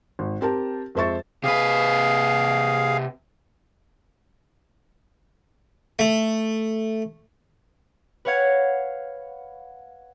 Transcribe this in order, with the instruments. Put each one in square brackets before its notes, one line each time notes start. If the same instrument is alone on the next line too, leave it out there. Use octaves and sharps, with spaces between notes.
[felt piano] G#1
C4 G4 A#4 A5
F2 G#3 C5 E5 C#6 A6
[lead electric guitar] C3 B4 [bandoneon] G#4 F5
[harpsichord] A3
[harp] B4 C#5 F5 F#5 G#6